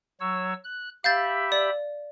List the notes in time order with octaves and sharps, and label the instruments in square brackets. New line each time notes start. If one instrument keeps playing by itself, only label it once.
[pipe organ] F#3 C#5 E6
F#6
[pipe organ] G4 E5 B5 [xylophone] F5 G6 A6
[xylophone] D5